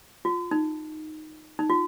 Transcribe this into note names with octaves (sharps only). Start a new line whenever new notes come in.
F4
D#4
D#4
F4